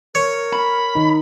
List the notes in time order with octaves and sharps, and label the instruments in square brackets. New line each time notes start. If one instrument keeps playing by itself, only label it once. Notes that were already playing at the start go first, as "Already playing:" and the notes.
[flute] A#4 [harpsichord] C#5
[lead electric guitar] B5
[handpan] D#3 D#4